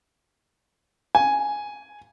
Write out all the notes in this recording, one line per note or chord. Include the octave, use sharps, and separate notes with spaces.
G#5